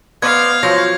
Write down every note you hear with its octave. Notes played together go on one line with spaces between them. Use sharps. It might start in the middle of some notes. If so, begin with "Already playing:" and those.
B3 C5 D5 D#5 F5 G#6
F3 F#3 F4 C5 C#5 A#6